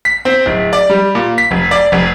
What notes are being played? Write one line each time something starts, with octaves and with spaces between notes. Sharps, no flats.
B6
C4
D1
D5
G3
A#2
B6
F1
D5
F1